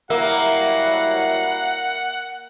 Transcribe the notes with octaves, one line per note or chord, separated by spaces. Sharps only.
F#3 G3 A#3 E4 A#4 E5 F#5